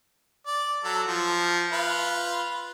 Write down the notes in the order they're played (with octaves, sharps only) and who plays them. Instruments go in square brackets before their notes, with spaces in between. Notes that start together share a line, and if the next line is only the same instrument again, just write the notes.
[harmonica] D5
F#3 A4
F3
F4 B4